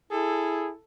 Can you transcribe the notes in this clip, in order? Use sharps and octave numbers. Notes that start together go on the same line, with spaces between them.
E4 G#4 A4